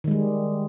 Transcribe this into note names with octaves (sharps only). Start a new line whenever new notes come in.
D#3 G3 G#3